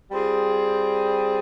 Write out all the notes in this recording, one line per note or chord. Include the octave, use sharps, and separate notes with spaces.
G3 C4 F4 G#4